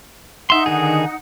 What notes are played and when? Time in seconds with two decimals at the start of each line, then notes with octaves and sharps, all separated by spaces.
0.50 D#4 E5 F#5 C6
0.66 D3 D#3 G#4